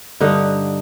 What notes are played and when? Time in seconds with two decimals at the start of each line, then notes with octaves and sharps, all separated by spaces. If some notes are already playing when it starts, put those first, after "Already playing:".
0.20 G2 D3 D#4 F#5